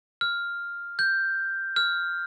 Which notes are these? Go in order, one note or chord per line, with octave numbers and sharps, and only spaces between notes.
F6
G6
F6